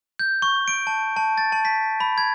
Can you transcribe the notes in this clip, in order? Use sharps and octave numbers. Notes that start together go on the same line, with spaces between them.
G6
C#6
D7
A5
A5
A6
A5
B6
B5
G#6